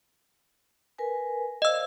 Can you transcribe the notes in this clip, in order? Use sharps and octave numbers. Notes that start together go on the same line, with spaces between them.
A#4 B4 G#5
C5 D5 D#5 F5 E6